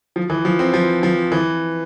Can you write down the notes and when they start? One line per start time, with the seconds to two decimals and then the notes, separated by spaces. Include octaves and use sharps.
0.16 F3
0.30 E3
0.45 F3
0.59 C4
0.74 F3
1.03 F3
1.32 E3